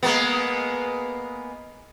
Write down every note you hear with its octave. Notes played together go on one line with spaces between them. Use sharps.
G#3 A#3 B3